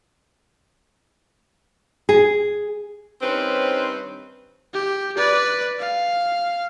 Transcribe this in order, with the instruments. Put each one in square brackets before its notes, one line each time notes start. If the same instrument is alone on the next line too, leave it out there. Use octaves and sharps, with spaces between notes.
[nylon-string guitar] G#4
[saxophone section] G2 D#3 C4 C#4 B4 C5
[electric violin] G4
B4 D5
F5